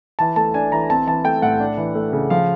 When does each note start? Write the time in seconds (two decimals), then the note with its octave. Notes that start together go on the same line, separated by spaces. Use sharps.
0.19 E3 A5
0.36 A3 A5
0.54 D4 G#5
0.72 E3 A#5
0.90 C4 A5
1.07 E3 A5
1.24 A3 G5
1.42 A2 F#5
1.60 D4
1.77 E3
1.95 A3
2.13 C#3
2.30 F3 F5